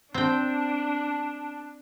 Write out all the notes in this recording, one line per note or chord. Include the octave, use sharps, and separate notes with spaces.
C4 D4 G5 A5